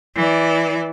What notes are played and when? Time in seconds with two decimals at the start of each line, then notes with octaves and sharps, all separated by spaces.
0.15 E3 D5